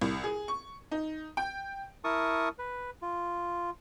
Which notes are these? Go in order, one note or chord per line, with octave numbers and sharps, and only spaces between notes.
C2
G#4
C#6
D#4
G5
E4 A#4 A5 C#6 D#6
B4
F4